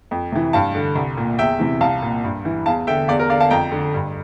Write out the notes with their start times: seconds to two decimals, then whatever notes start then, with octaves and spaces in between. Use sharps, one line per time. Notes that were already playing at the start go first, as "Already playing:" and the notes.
0.11 F2
0.32 C3 E3
0.53 G2 F5 A5
0.75 D3
0.96 C2
1.17 A#2
1.39 E2 E5 G5
1.59 C3 E3
1.81 C2 F5 A5
2.02 A#2
2.24 G2
2.45 E3
2.66 E2 F5 A5
2.87 D3 E5 G5
3.08 E2 D5 F5
3.19 A#4
3.30 D3 D5 F5
3.40 F5 A5
3.51 F2 G5 A#5
3.72 D3
3.94 G2